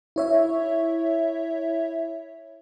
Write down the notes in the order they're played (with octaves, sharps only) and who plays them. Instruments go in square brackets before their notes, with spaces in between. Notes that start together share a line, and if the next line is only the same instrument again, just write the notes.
[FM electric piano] E4 C#5 E5